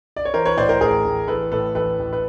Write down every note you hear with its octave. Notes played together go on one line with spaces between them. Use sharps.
D5
C#5
E3 A#4 C5
B4 C#5
A2 C5 D5
A#4 C5
A1 G#4 A#4
A1
E3 A4 B4
A2 A4 B4
A1 A4 B4
A1
B4